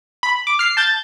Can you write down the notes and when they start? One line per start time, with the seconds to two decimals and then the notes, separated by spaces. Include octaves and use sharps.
0.23 B5
0.47 D6
0.59 F6 C7
0.77 A5 G6 A6